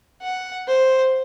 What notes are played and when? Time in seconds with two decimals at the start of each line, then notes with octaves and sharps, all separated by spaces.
0.22 F#5
0.68 C5